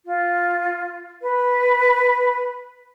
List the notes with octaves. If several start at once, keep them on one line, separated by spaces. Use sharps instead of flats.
F4
B4